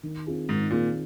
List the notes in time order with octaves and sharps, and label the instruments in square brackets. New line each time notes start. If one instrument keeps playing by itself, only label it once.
[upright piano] D#3
C4 F4 G#4
[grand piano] G#2 [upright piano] D#3
[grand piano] A#2 [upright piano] C4 F4 G#4